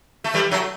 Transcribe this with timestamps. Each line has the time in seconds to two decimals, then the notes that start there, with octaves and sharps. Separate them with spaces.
0.24 A3
0.34 E3 G3
0.51 F#3 A3